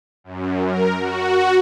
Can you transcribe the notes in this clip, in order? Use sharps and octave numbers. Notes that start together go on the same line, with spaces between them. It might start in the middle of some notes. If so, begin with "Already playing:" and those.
F#2
A#4
F#4